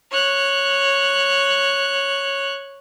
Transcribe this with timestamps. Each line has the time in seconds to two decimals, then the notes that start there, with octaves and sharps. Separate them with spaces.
0.11 C#5 F#6